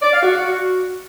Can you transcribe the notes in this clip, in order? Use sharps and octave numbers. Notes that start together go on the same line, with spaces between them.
D5
F5
F#4